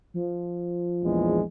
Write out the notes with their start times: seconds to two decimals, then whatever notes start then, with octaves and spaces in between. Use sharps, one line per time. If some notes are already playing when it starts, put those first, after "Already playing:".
0.14 F3
1.03 A#1 E2 G#3